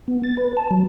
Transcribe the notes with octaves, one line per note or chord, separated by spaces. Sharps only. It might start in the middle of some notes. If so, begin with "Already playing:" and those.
B3
A6
B4
A5
F#3